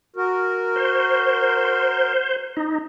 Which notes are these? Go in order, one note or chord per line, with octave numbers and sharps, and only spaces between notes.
F#4 A#4
C5
D#4